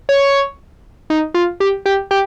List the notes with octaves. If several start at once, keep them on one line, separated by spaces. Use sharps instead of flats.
C#5
D#4
F4
G4
G4
G4